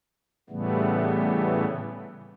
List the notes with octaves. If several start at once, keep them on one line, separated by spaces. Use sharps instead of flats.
A2 C#3 E3 G3 A3 B3